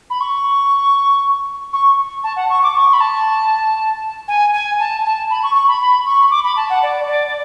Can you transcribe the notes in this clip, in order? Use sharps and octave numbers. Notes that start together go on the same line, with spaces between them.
B5
C#6
C#6
A5
F#5
C#6
D6
C#6
B5
A5
G#5
G#5
A5
A5
B5
C#6
C#6
B5
B5
C#6
D6
B5
A5
F#5
D5
D5
D5